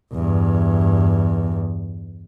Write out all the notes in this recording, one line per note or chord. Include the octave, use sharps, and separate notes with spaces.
E2 G2